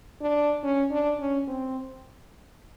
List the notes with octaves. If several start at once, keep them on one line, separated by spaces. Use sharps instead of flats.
D4
C#4
D4
C#4
C4